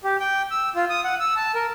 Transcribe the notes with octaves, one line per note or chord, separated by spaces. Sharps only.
G4
G5
E6
F4
D#6
F#5
E6
A5
A#4